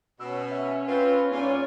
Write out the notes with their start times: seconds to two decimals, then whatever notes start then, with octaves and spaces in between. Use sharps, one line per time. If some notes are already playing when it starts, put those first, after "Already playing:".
0.20 B2 C#4 E6
0.51 E5
0.88 C4 F4 B4
1.32 G#2 C#4 F4 C#5 D5 G#5